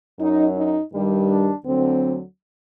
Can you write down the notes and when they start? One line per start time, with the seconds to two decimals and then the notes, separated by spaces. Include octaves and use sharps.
0.20 F#2 F#3 D#4
0.57 D#4
0.93 G2 D#3 G3
1.29 D4
1.64 D2 D3 F#3 C4